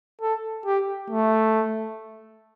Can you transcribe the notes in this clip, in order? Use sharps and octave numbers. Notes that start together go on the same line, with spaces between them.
A4
G4
A3